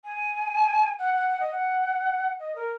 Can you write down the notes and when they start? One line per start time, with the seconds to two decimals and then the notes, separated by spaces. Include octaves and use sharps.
0.04 G#5
0.99 F#5
1.14 F#5
1.29 F#5
1.40 D#5
1.51 F#5
2.39 D#5
2.55 A#4